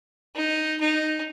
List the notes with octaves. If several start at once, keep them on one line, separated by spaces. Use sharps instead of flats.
D#4
D#4